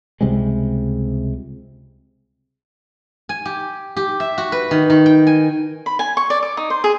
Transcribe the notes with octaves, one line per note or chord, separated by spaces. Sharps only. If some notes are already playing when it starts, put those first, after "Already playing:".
C#2 C3 G3 G#3
G#5
G4
G4
E5
F#4
B4
D#3
D#3
G5
G#5
B5
G#5
C#6
D5
D6
D#4
C5
G#4